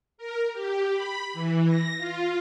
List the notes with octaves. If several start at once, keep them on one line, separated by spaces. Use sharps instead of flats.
A#4
G4
B5
E3
A#6
F4